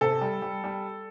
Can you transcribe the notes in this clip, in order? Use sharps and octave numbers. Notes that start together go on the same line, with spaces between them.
C3 A4
G3
G3
G3